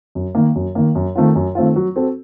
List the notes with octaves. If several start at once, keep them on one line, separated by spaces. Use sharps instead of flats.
F#2
D#3 A#3
F#2
D#3 A#3
F#2
D#3 A3 C4 F4
F#2
D#3 A3 C4 F4
F#3
C4 F#4 A4